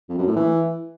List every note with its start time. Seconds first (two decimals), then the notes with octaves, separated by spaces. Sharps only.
0.09 F2
0.18 F#2
0.27 A2
0.36 E3